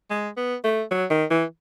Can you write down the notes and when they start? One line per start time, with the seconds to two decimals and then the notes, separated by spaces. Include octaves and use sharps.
0.11 G#3
0.37 B3
0.64 A3
0.91 F#3
1.11 D#3
1.31 E3